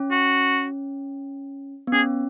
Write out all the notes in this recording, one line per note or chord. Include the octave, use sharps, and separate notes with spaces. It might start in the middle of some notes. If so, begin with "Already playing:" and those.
Already playing: C#4
F#4
B3
C#4 G#4